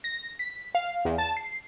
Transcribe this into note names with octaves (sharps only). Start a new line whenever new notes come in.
A#6
B6
F5
E2
A5
C7